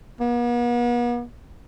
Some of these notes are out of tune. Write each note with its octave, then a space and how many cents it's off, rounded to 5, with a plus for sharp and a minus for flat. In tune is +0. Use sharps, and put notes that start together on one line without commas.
B3 -45